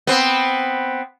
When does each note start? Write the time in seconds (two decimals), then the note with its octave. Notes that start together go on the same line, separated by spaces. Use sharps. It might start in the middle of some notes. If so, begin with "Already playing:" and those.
0.07 B3 C4